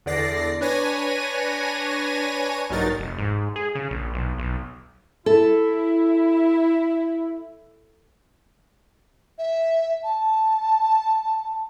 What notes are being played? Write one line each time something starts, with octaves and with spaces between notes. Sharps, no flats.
E2 D3 D5 A#6 C7
D4 B4 C#5 G#5 A#6 D#7
A#1 G2 F#3 D#4 A#4 A6
F1
G#2
G#4
C#3
A#1
B1
B1
E4 A4
E5
A5